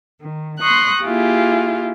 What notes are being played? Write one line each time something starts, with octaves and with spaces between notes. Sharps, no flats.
D#3
C6 C#6 D#6 F#6 A#6
A#3 E4 F4 G4 G#4